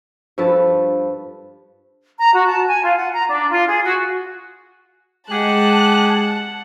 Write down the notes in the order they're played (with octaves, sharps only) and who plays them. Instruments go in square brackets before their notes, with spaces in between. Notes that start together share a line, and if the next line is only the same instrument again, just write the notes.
[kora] G2 F3 A4 B4
[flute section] A#5
F#4
A5
G#5
F4
F#5
A#5
D4
F4
G#4
F#4
[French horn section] G#3 [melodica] G4 G#4 G#5 [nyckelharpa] F#5 [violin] A5 F#6